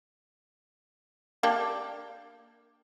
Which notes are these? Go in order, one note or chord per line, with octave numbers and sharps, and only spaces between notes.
A#3 D4 G4